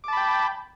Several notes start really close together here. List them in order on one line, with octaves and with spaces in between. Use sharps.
D6 A5 B5 G5